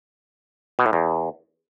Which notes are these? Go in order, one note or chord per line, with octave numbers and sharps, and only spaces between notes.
B2
A2
E2